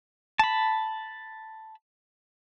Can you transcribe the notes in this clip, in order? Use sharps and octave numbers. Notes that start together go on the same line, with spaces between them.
A5 B5